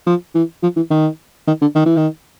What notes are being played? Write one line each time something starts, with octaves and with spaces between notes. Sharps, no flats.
F3
E3
F3
E3
D#3
D#3
D3
D#3
E3
D#3